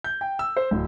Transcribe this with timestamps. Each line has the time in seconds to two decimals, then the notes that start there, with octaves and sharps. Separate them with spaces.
0.04 G6
0.21 G5
0.39 E6
0.57 C5
0.71 D1